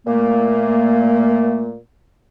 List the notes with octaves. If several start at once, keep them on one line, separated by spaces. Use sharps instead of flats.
A#2 A3 A#3